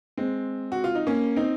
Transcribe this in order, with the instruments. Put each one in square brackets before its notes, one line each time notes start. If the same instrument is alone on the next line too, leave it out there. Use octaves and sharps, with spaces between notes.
[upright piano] G#3 C4
F#4
F4
D#4
A#3 C#4
C4 D#4